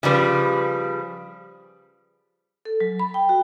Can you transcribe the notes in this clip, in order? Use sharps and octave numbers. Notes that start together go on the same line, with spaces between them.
C#3 F3 G3 B4
A4
F#3
B5
G5
F#4